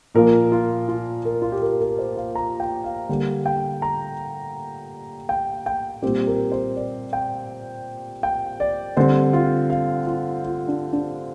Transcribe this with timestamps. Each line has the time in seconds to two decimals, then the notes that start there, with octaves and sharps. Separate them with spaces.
0.14 A#2 F3 A#3 A#4
0.52 F4
0.88 F4
1.25 A#4
1.42 F4
1.52 G4
1.62 A#4
1.81 A#4
1.99 C5
2.17 F5
2.35 A#5
2.60 G5
2.84 F5
3.09 D3 G3 A#3
3.46 G5
3.82 A#5
5.29 G5
5.66 G5
6.02 A#2 G3 C4 G4
6.27 A#4
6.52 C5
6.76 D5
7.13 G5
8.23 G5
8.60 D5
8.97 D3 G3 C4 C5
9.33 F4
9.70 F5
10.07 F4
10.44 F4
10.68 D4
10.93 D4